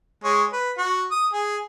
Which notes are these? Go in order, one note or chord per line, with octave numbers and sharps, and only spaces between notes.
G#3 C#5
B4
F#4 F#5
D#6
G#4